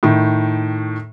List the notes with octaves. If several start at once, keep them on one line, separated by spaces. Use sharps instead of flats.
A2 D#3